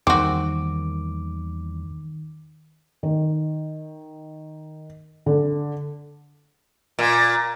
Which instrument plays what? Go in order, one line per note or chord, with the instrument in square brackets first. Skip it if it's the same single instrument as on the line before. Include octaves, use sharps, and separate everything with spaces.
[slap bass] E2 G3 A#3 [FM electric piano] D#3 [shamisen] C4 F#4 [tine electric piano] D6
[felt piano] D#3
D3
[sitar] A#2